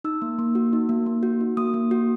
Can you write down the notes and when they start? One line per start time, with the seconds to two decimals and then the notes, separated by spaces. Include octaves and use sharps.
0.04 D#4 E6
0.22 A#3
0.39 A#3
0.55 F#4
0.73 D#4
0.89 A#3
1.06 A#3
1.23 F#4
1.41 D#4
1.57 A#3 D#6
1.74 A#3
1.91 F#4